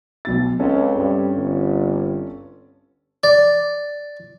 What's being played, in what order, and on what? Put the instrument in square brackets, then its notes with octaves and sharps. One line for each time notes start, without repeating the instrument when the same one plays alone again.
[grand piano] B1 B2 A6
[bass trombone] C#2 [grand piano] C4 C#4 A4
[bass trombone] G2
G1
[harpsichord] D5